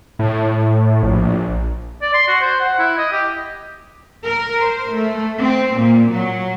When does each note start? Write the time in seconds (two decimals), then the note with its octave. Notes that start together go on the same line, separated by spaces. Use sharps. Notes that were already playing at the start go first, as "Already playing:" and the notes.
0.19 A2
1.03 A#1
2.02 D5
2.14 C6
2.28 F#4
2.41 C5
2.60 F#5
2.79 E4
2.97 D#5
3.12 G4
4.25 A#4
4.60 C5
4.92 A3
5.40 C4
5.75 A#2
6.13 F#3